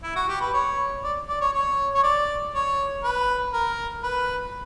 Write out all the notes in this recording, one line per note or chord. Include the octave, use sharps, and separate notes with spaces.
E4
F#4
G4
B4
C#5
D5
D5
C#5
C#5
C#5
D5
C#5
B4
A#4
B4